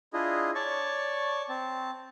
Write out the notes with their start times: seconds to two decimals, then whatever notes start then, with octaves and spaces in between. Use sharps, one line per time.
0.13 D4 E4 F4 G#4 D#5
0.55 C#5 D5 A5 C#6
1.49 C4 A5